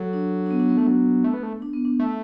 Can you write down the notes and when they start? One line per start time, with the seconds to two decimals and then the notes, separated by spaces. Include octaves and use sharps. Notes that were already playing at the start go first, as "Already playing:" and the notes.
Already playing: F#3 A4
0.13 D4
0.46 D4
0.51 B3
0.59 D4
0.69 B3
0.77 A3 D4
0.87 F#3
1.24 A3
1.34 B3
1.43 A3
1.62 D4
1.73 B3
1.85 D4
2.00 A3